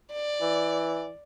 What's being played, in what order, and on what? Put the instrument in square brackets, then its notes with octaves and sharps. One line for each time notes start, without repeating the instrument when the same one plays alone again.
[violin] D5
[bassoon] E3